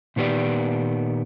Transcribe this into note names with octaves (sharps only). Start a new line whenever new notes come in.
A#2 D#3 B3 G4 D5